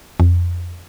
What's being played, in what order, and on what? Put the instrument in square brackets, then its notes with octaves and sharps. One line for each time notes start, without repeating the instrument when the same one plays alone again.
[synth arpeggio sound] F2